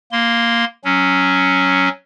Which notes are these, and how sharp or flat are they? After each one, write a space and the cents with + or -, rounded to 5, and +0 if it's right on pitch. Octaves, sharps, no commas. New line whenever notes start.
A#3 +0 C6 -15
F#3 +0 C#4 +0